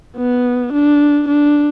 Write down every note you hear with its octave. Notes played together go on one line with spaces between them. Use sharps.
B3
D4
D4